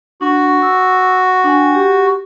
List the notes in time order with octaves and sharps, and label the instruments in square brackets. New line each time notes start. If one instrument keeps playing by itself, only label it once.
[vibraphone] D4 [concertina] F#4
[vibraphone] E6
D4 G5 G#5
G4